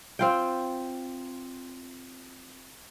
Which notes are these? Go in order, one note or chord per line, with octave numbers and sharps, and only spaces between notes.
C4 F4 G5